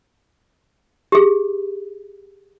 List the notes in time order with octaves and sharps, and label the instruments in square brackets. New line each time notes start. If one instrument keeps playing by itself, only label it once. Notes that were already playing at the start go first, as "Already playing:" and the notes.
[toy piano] G4 G#4